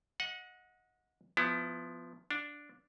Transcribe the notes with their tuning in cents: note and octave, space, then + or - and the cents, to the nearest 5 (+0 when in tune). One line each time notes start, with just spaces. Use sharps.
D#5 +25 F#5 -20
F3 +0 B3 +20 E4 +20
D4 +0 F5 +40